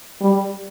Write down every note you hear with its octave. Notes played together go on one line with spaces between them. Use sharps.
G3